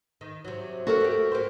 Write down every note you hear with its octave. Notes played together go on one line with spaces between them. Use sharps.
D#3
C3 F#3
F#4 A4 A#4
A3 G4
A#3 G4 C5